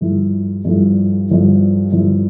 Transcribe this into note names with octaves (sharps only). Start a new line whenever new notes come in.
G2 F3 A3 E4
G2 F3 A3 E4
G2 F3 A3 E4
G2 F3 A3 E4